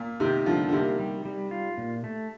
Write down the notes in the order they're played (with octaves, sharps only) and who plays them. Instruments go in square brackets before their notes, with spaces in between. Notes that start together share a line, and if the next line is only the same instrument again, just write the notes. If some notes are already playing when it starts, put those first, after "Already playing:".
Already playing: [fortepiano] A#2
[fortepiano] C3 D#3 [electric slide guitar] G4
[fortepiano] D3 F3 [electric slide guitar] G3
[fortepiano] D3
[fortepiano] C3 D#3 [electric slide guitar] A#3
[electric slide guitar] G3
G3
F4
A#2
A3